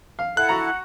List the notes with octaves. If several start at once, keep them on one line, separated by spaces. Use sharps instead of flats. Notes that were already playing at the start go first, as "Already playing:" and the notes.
F5
E4 A4 F#5 F#6
F#4 A#5